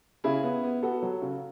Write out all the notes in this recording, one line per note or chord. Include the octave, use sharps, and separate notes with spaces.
C#3 E4 G#4
B3
B3
B3 F#4 A4
F#3
C#3